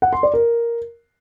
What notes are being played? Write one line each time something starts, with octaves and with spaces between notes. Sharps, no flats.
F#5
C6
D5
A#4